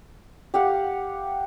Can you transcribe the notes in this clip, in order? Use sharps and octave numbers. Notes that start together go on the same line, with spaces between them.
G4 F5 F#5